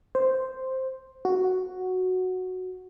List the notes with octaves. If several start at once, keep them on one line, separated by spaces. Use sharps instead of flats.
C5
F#4